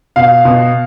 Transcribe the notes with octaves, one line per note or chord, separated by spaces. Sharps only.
B2 F5
B2